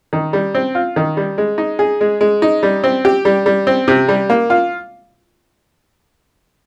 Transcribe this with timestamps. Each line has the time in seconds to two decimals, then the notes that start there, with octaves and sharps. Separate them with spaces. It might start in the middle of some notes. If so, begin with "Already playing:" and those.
0.13 D#3
0.33 G3
0.55 C4
0.75 F4
0.96 D#3
1.17 G3
1.38 G#3
1.58 D#4
1.79 G#4
2.01 G#3
2.21 G#3
2.42 D#4
2.63 G3
2.84 C4
3.05 G4
3.25 G3
3.46 G3
3.67 C4
3.88 C3
4.08 G3
4.30 A#3
4.50 F4